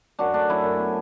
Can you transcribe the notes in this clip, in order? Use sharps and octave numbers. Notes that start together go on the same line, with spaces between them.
F#2 D4 F#4
A3 D4
F#2 E4
F#2
B3